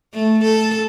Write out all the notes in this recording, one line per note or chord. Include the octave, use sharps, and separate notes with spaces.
A3
A4